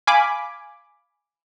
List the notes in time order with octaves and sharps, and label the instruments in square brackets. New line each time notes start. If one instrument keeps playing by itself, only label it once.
[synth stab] F5 G#5 B5 D6